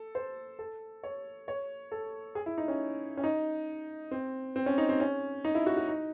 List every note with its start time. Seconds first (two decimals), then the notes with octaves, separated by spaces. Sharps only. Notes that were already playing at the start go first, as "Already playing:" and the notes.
Already playing: A4
0.15 C5
0.59 A4
1.03 C#5
1.48 C#5
1.92 A4
2.35 G#4
2.46 E4
2.58 D#4
2.68 C#4
3.17 C#4
3.24 D#4
4.11 C4
4.56 C4
4.66 C#4
4.78 D#4
4.89 C4
5.00 C#4
5.45 D#4
5.55 E4
5.66 F#4
5.77 F#4
5.88 D#4